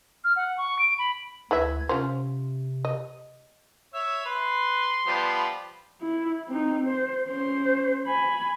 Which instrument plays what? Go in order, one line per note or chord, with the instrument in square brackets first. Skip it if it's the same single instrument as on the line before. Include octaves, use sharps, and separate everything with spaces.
[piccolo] F6
F#5
C#6
D7
B5
[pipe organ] D2 G#6 [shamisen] E3 B4 E5
[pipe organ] C3 [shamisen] C#4 F4 C5
[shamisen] D#5
[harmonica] C#5 E5 [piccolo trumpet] E6
[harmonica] B4 [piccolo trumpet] C6
[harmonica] F3 G3 B3
[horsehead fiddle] E4
C4 D#4
C5
C#4 C5
G#5 B5